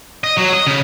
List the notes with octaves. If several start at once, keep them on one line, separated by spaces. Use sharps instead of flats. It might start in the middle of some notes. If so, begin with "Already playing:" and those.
D#5
F#3
D#5
C#3